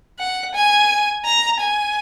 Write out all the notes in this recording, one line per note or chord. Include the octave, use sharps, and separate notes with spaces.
F#5
G#5
A#5
G#5